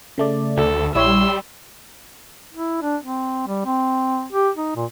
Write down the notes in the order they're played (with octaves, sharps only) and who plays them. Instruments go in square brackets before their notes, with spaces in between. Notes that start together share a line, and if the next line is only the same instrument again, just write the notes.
[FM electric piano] C#3 A3 D5
[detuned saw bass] D2 [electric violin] A4
[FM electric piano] A#1 E4 C#5 [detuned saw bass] G3 [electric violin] C6 E6
[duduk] E4
D4
C4
G3
C4
G4
D#4
A#2